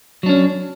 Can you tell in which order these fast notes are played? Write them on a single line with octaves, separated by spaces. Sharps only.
F#3 D4 C#4